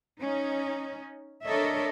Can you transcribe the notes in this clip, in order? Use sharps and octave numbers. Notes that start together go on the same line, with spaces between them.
C#4 D#4
D4 A4 A#4 C#5 D#5 E5